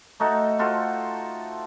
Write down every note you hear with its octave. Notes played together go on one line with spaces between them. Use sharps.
A3 D#4 F#4 A4
F4 F#4 A4 C5